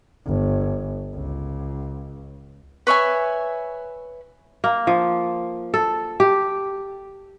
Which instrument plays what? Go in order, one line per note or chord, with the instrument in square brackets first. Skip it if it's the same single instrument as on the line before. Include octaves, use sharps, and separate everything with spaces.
[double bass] G1
C#2
[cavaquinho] B4 C#5 E5 G#5
[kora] A#3
F3
A4
G4